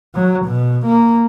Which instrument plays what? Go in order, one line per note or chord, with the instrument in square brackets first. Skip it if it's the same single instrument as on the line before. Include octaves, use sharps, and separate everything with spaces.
[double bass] F#3
B2
A#3